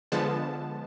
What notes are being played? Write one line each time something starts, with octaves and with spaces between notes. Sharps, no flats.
D3 F3 G#3 B3 A5